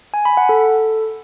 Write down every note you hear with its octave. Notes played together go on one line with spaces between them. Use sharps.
G#5
B5
F#5
A4